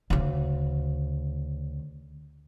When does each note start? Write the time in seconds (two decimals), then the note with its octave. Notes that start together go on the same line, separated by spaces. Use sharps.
0.10 D2 C#3